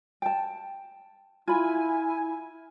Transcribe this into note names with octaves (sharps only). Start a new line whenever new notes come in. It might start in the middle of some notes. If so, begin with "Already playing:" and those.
G5 A5
E4 F4 G#5 B5